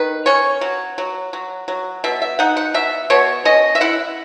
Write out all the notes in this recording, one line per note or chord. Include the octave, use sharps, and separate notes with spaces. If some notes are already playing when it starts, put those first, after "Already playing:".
Already playing: D#3 B4
C#4 C#5
F#3
F#3
F#3
F#3
B2 E5
E5
D#4 F#5
F#5
B2 E5
B2 C#5
C#4 D#5
E5
E4 F#5